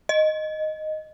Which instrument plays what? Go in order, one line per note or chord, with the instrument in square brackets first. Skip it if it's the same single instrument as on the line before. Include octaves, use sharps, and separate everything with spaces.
[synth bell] D#5